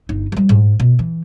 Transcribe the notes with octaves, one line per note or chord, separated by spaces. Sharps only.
G1 D#4
F3 G3
G#2
B2
E3